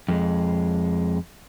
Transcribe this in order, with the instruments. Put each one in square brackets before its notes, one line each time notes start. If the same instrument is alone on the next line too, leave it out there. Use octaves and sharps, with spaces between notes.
[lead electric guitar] F2 G#3